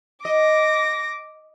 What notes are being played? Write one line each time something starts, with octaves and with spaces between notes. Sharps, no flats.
D#5 D6 A#6